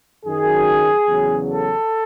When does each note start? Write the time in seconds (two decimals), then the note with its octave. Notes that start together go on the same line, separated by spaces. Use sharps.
0.25 F#2 D#3 F#3 G#4
1.08 E2 C#3 F#3
1.49 A4